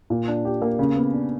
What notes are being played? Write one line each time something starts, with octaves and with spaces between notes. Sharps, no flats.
A#2
D4
G4
A#3
C#3
B3
D4